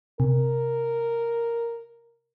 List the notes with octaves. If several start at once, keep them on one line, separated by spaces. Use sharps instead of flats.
C3 A#4